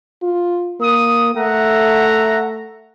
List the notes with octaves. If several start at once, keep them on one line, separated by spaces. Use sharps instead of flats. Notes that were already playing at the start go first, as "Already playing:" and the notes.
F4
A#3 D#6
A3 E5 F#5 A#5